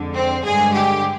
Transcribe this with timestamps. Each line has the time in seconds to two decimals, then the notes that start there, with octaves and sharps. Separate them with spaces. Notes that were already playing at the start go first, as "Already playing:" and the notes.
Already playing: F2 D3 G#3
0.14 C4
0.43 G2 D3 G#3 G#4
0.73 G4